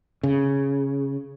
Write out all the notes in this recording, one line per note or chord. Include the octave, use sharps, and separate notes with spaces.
C#3